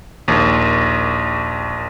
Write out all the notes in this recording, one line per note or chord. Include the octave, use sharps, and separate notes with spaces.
A#1 D#2